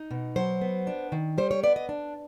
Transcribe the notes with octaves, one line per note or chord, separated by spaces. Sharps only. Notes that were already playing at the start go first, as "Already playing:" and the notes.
Already playing: D#4
B2
F#3 C5
B3
D4
D#3
G3 C5
C#5
B3 D5
D#5
D4